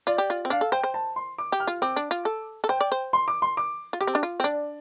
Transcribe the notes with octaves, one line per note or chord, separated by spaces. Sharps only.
F4 D5
G4
F4
C4
D4 F5
A4
C5 G5
C5
A5
C6
D6
G4
F6
F4
C4 D6
D4
F4
A4
A4
C5 G5
D5
C5
C6
D6
C6
D6
F4
G4 D6
C4
D4
F4
C4
D4 D5